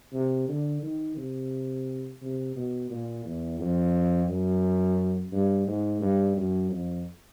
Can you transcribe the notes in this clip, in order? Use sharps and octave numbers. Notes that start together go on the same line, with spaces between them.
C3
D3
D#3
C3
C3
B2
A#2
E2
F2
F#2
G2
G#2
G2
F#2
F2